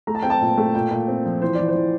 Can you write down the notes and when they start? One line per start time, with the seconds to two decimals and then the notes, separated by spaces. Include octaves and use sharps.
0.07 A3 A#5
0.15 A5
0.23 C4 G5
0.30 A5
0.41 A#2
0.58 A3
0.75 A#2 G5
0.91 A#2
1.08 C4
1.25 F3
1.41 E3 C5
1.55 E3 D5
1.68 C5
1.75 E3